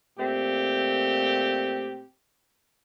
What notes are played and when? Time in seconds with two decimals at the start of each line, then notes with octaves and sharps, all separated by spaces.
0.18 A#2 A3 C4 G4